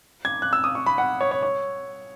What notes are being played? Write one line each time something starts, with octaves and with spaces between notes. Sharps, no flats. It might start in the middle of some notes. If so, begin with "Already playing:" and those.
G#6
F#6
E6
D#6
C#6
B5
F#5
C#5
C#5
C#5